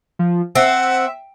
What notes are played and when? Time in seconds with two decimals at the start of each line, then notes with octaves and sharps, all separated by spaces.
0.19 F3
0.55 C4 E5 F#5